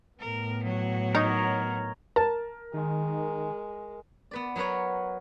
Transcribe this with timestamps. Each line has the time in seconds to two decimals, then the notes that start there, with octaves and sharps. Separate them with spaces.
0.19 A2 B3 A#4
0.63 F#3 F#4
1.15 D#4 A#4 C#5 D#5
2.16 A#4 A5
2.74 D#3 G#3
4.31 B3 B4 D5
4.56 F#3 B3 A#4 B4 C#5